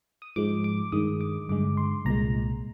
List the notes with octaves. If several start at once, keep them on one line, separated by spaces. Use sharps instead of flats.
D#6
G#2 F3 G#3 D6
D6
G2 D#3 G#3 D#6
D6
G2 D3 G#3 D6
C6
C2 A#2 G#3 A#5